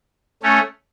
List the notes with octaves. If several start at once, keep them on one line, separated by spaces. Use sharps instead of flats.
A3 C#4